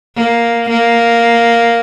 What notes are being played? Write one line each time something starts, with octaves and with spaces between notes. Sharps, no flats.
A#3
A#3